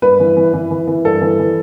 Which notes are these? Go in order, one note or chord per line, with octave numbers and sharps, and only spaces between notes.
G2 B4
E3
E3
E3
E3
E3
G2 A4
E3
E3